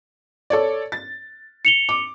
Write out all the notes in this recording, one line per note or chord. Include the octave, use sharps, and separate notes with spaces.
A4 C#5 D5
A6
C#7 F7 G7
D6